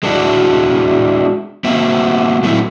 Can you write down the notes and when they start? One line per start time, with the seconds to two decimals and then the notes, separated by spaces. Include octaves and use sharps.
0.03 G#3 A#3 D4 E4 F#4 D5
1.64 A#3 C4 F#4 E5
2.43 F#3 A3 C4 D#4 E4